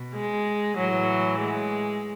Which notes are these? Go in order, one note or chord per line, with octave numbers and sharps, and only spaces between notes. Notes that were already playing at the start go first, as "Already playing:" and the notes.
Already playing: B2
G#3
A2 E3 F#3
G#3